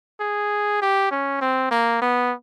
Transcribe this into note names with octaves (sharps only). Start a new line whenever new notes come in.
G#4
G4
C#4
C4
A#3
B3